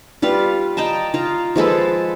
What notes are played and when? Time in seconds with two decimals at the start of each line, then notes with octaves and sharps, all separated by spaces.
0.22 G3 F4 B4 F5
0.77 D#5 G5 A5 A#5
1.14 F4 A#5
1.56 F3 G#3 A4 B4